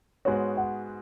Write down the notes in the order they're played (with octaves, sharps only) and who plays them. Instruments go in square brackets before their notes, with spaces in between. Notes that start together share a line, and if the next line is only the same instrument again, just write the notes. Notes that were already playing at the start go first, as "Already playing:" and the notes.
[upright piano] G#2 G#3 B3 F#4 [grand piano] C#5
[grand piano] F#5